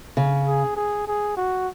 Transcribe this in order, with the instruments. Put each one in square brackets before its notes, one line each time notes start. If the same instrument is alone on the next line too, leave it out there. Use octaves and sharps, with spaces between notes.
[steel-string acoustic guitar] C#3
[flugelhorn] G#4
G#4
G#4
F#4